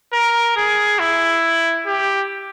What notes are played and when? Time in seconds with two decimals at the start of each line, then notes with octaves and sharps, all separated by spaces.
0.13 A#4
0.56 G#4
0.99 E4
1.87 G4